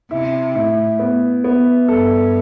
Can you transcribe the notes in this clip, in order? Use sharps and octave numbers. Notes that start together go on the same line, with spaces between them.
C3 E4
A2 E4
B3
B3
G2 A4